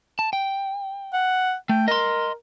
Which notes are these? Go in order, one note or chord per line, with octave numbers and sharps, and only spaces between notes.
A5
G5
F#5
A3 G5
A#4 D#5 C6